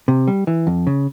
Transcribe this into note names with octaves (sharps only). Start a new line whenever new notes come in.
C3
G3
E3
F2
C#3